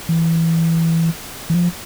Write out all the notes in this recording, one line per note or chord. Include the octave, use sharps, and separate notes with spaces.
E3
E3
F3